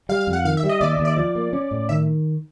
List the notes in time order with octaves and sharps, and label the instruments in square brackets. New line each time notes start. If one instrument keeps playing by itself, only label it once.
[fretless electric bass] G3 [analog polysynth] F5
[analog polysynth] F5
[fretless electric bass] F2
[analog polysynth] F#5
[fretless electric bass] D#3 [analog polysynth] F5
[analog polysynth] E5
[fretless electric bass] G3
[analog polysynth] D#5
[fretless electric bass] D#2 [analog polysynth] D5
[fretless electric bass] D#2
[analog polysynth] D5
[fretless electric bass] F3
A#3
C#4
A2
[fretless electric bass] D#3 [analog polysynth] E5